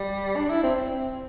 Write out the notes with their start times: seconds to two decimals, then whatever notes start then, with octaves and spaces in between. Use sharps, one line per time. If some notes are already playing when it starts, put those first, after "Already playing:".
Already playing: G3
0.36 D4
0.50 E4
0.63 C4
0.75 C4